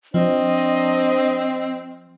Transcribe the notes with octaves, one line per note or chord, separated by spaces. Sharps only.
F3 C4 D4 C5 D#5